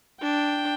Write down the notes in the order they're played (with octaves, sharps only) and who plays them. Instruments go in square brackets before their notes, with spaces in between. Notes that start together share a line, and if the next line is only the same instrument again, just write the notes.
[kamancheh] D4 [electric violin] G5